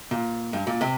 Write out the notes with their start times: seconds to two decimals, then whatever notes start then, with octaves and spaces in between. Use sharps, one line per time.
0.11 A#2
0.53 G2
0.67 A#2
0.81 C3